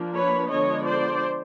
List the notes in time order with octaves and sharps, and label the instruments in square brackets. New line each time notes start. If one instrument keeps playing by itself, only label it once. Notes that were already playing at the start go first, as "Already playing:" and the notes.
Already playing: [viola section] F3 A#3 D4
B4 C#5
D3 F3 G#3 B3 D4 C#5 D#5
C5 D5